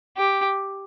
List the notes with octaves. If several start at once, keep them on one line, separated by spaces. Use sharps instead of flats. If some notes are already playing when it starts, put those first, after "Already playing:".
G4